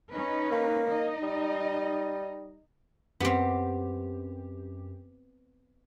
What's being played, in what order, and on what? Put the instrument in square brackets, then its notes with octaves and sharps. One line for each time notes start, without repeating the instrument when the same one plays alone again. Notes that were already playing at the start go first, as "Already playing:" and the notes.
[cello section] C#4 D#4 B4
[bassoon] A#3
[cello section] D#4 D#5
[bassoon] G3
[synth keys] F#2 G4 [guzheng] B3 C4